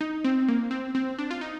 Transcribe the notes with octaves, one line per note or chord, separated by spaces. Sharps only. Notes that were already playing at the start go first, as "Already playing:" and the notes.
D#4
C4
A#3
C4
C4
D4
F4
D#4